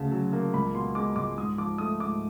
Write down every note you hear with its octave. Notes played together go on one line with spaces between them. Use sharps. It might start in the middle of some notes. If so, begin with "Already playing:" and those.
Already playing: D2 C#3 A5
F#3
A#3
C#2 B5
B2 C6
G#3 D6
C#2 D6
G#2 D#6
F3 D6
A3 D#6
G#2 D6